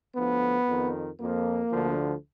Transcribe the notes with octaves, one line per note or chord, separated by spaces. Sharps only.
D2 D3 F3 B3
F2 D#3
F2 F3 A#3
D2 D3 F3